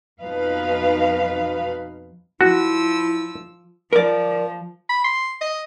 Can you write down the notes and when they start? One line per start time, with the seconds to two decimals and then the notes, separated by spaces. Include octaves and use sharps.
0.21 F2 B2 F3 D#4 B4 F5
2.41 F3 E4 F#4 E6
3.93 F3 A#4 D5
4.89 B5
5.04 C6
5.41 D#5